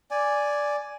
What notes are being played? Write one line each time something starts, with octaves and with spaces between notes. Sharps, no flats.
D5 G#5